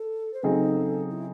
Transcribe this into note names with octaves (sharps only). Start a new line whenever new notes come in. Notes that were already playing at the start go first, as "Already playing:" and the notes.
Already playing: A4
C5
C#3 F#3 C4 D#4 G#4 A4
E4